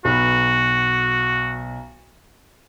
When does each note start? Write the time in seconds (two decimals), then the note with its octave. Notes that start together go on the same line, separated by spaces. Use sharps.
0.05 B1 B3 F#4 B5